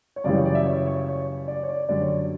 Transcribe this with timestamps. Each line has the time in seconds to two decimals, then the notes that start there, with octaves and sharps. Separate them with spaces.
0.16 C#5
0.24 F#2 C#3 E3 G3 D5
0.35 C#5
0.45 D5
0.55 E5
0.65 C#5
0.86 C#5
1.09 C#5
1.48 D5
1.63 C#5
1.69 D5
1.89 F#2 D3 G3 D5
2.01 C#5